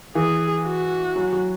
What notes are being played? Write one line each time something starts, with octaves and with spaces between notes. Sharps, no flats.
E3 G#4
F#4
F#3
F#3